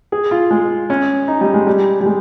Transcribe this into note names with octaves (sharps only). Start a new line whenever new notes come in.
G#4
F4
G#3
C#4
D#4
G3
G#3
G3
G3
G#3